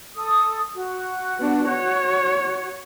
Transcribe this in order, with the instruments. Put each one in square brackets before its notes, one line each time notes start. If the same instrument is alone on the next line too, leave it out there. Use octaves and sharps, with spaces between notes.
[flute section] A4 D#6
F#4
[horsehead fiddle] B3 D4
C#5